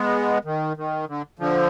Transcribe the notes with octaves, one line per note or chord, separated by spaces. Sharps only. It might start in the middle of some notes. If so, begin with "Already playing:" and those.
Already playing: G#3 B3
D#3
D#3
D3
D3 F3